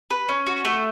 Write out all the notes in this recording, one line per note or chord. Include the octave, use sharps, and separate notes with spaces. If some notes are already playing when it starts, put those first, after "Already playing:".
B4
C#4
F#4
A3